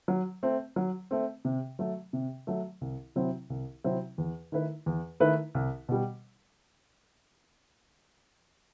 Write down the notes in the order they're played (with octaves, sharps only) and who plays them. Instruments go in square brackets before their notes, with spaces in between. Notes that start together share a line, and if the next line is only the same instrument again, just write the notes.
[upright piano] F#3
A3 C4
F#3
A3 C4
C3
F#3 A3
C3
F#3 A3
C2
C3 F#3 C4 E4
C2
C3 F#3 C4 E4
E2
D#3 A3 E4 B4
E2
D#3 A3 E4 B4
C2
B2 G3